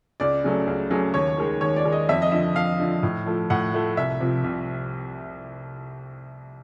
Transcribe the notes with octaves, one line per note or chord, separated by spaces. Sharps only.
C#2 D5
C#3 F#3 A3
C#2
C#3 F#3 A3
D#2 C#5
D#3 G#3
D#2 C#5
D5
D#3 G#3
D#5
F2 E5
D#5
D3 F3 E5
F2 F5
D3 F3
A2
F3 A3
A2 F#5
F3 A3
C2 E5
C3 F3
C2